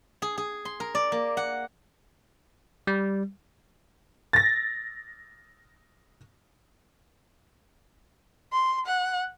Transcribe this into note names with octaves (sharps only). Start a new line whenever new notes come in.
G#4
G#4
C6
A#4
D5
A#3
F#5
G3
A6 A#6
C6
F#5